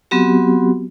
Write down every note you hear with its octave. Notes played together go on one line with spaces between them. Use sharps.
F#3 B3 C4 F#4 G4